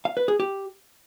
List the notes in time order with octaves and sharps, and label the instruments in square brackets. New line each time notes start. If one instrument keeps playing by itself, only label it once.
[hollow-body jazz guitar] F5
B4
G#4
G4